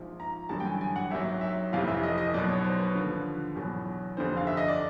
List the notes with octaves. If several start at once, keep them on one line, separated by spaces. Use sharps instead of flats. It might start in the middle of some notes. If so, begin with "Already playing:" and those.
Already playing: A#1 G#2 F3
A#5
A1 G2 D3 F#3 A5
G5
G#5
G#5
F#5
G#1 G#2 D#3 F#3 E5
E5
F1 F2 C3 E3 F5
E5
D#5
D#5
B1 B2 F#3 D5
C#5
C5
B4
D#2 D3 F3
E2 B2 F#3
F1 F2 D3 C5
F5
E5
D#5
D5